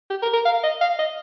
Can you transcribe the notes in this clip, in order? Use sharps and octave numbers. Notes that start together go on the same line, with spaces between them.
G4
A#4
A#4
F5
D#5
F5
D#5